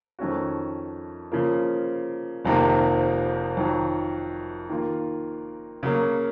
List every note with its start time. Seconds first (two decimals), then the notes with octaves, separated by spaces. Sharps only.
0.19 F2 D#3 A3 C#4 F#4
1.32 C#3 F3 A#3
2.45 F1 F2 C3 D#3 A#3
3.57 F2 D#3 F#3
4.69 D#3 A#3 F4
5.83 C#3 F#3 A#3